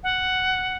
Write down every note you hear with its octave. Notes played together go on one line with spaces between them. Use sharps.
F#5